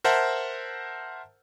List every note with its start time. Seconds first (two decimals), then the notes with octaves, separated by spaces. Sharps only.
0.04 A#4 C5 E5 F#5 A5